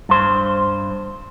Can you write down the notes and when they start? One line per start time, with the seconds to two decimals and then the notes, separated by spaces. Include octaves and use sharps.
0.09 G2 C5